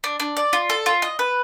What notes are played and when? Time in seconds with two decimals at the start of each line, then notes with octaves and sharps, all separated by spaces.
0.04 D4
0.20 D4
0.37 D5
0.53 F4
0.70 A4
0.86 F4
1.02 D#5
1.19 B4